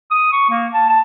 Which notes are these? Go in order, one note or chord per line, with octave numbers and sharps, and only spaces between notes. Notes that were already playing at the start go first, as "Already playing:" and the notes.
D#6
C#6
A#3
A5
A5